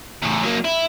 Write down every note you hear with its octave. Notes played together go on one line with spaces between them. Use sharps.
E2 A2
F#3 A#3
E4